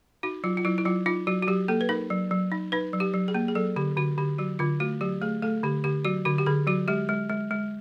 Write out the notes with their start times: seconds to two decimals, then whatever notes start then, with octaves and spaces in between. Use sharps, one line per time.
0.23 D#4 F#4
0.44 F#3 F4
0.57 F4
0.65 F#3 E4
0.78 E4
0.85 F#3 F4
1.06 D#4 F4
1.27 F#3 F#4
1.43 F#4
1.47 F#3 G4
1.68 A#3 A4
1.81 B4
1.89 D#4 A#4
2.10 F#3
2.31 F#3
2.52 D#4
2.72 D#4 B4
2.93 F#3
3.00 G4
3.14 F#3
3.28 G#4
3.35 A#3
3.48 G#4
3.55 F#3 A4
3.76 D3 G4
3.97 D3 F#4
4.18 D3 G4
4.39 F#3 F#4
4.59 D3 F4
4.80 A3 F#4
5.01 F#3 G4
5.22 A3 G#4
5.42 A3 A4
5.63 D3 G4
5.84 D3 G4
6.05 F#3 F#4
6.25 D3 F#4
6.38 G4
6.46 D3 G#4
6.67 F#3 F#4
6.88 G#3 G4
7.09 G#3
7.29 G#3
7.51 G#3